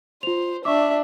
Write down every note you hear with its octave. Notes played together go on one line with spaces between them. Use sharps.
F4 C5 F7
D4 E5 C#6 D6